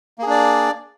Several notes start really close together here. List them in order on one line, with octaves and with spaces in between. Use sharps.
A#3 G#4 D4 D5